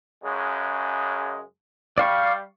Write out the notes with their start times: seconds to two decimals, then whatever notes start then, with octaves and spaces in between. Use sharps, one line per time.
0.23 F#2 C#3 G#3
1.98 G3 D5 F5 C#6